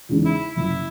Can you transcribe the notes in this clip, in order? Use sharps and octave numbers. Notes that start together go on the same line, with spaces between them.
E2 C#3 G#3 D#4
E4
F#1 E4